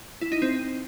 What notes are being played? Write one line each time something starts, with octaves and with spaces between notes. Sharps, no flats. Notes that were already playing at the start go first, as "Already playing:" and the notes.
E4
D#4
C4